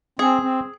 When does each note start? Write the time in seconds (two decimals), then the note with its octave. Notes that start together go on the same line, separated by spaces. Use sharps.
0.19 C4 G#4
0.42 C4